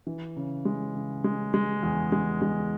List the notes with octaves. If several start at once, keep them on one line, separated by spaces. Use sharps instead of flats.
E3
C#3
G#3
C#3
G#3
G#3
E2
G#3
G#3